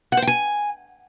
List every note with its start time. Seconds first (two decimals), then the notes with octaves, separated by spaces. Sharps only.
0.12 F#5
0.17 C5
0.22 G5
0.27 G#5